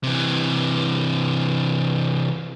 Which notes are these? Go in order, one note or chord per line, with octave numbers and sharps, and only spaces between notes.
C3 E3